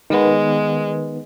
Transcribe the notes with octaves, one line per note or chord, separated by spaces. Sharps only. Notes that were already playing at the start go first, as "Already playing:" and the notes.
D#3 G#3 B3